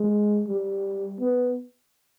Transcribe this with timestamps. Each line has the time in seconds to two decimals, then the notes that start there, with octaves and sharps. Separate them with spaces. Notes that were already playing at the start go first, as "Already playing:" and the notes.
Already playing: G#3
0.48 G3
1.20 B3